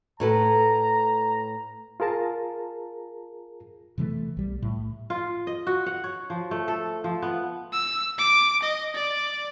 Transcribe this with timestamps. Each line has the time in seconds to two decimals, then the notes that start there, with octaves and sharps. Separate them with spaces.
0.20 A2 A4 B4 A#5
2.00 F4 G#4 A#4 A5 A#5
3.98 C3 E3 F3 A3
4.37 B1 G3
4.62 A2
5.10 F4
5.47 D#5
5.67 F#4
5.86 F#5
6.04 C#5
6.30 F3
6.51 A3
6.68 A4
7.04 F3
7.22 B3
7.73 E6
8.18 D6
8.62 D#5
8.94 D5